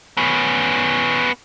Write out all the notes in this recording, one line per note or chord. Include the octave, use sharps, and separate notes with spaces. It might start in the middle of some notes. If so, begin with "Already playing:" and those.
B3 C#4